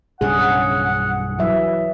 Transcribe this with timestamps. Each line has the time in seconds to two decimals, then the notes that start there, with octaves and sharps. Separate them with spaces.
0.21 B1 G2 C#3 D4 G#4 F#5
1.39 E3 F#3 E5